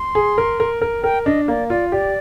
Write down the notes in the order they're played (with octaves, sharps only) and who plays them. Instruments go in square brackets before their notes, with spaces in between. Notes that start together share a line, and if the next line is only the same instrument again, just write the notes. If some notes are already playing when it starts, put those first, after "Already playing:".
Already playing: [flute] C6
[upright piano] G#4
A#4
A#4
A#4
[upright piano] A#4 [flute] G5
[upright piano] D4 [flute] D#5
[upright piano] A#3 [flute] D5
[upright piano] F4 [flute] D5
[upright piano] G4 [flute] D5